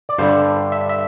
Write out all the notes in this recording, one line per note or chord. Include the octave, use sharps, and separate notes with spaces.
D5
G2 D3 G3 C5
E5
E5